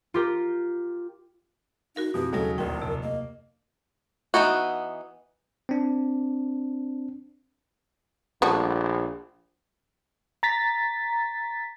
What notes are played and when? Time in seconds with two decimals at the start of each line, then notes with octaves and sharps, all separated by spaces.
0.14 F4 G4 A#4
1.96 D#4 F#4 A#4 F5
2.14 F2 B2 E3 G4
2.33 D#2 C#3 F#3 G#3 F#4 A4 A#6
2.58 D1 A#1 A#4 G5
2.77 F2 C3
3.03 A#3 D#5
4.34 E3 B3 D#4 F#4
5.69 C4 D4
8.42 A#1 G3 A3 F#4
10.43 A#5 A6 B6